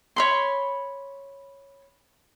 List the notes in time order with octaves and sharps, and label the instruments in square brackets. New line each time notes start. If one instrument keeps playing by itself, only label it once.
[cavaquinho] C#5 B5 C6